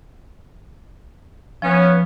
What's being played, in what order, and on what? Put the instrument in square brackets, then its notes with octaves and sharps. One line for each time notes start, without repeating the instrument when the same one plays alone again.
[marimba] F3 [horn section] B3 C#4